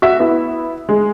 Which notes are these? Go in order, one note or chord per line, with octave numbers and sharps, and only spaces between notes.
F#4 E5
B3 E4
G#3